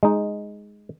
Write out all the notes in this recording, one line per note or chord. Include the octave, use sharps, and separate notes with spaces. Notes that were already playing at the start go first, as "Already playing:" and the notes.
G#3 D#4